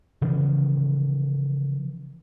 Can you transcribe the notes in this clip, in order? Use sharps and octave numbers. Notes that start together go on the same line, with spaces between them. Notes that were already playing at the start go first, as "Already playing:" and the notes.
C#3 E3 F3